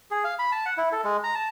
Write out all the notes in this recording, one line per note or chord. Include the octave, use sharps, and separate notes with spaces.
G#4
F5
B5
A5
F#5
E4
A4
G#3
A#5
A5